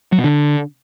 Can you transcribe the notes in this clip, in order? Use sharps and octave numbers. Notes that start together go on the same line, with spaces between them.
F#3
B2
D3